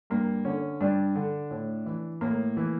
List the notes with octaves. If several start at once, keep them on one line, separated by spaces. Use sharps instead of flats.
G2 A#3
D3 C#4
G2 D4
D3
A2
E3
A2 A#3
E3